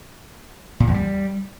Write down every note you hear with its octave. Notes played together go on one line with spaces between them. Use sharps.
A#2
E2
G3